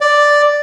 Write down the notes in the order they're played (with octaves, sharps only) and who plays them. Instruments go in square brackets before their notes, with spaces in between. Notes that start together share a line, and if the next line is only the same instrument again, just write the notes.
[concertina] D5